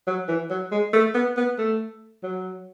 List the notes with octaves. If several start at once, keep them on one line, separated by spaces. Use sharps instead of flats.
F#3
E3
F#3
G#3
A3
B3
B3
A3
F#3